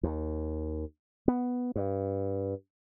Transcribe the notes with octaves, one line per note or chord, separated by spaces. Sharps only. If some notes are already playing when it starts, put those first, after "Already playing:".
D#2
B3
G2